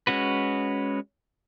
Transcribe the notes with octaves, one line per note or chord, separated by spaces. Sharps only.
G#3 C#4 F#4 B4